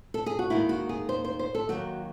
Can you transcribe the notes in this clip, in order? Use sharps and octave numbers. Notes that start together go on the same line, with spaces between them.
A4
G#4
F#4
D#2 D#3 G#3 E4
F#4
G#4
C5
C5
C5
A4
D#2 D#3 F#3 F#4